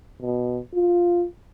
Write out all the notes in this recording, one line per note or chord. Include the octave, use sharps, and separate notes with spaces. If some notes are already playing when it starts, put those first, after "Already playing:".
B2
F4